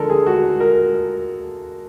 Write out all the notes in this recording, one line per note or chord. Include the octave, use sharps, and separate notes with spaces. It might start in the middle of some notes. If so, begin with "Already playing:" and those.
Already playing: D3 F3 G#3 A4 A#4
G#4
F#4
A#4